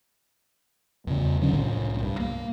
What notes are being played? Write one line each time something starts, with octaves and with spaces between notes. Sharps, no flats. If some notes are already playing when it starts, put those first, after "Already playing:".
E2 C#3
D3 F#3 C#4 D4
C2 A2
G2
A#3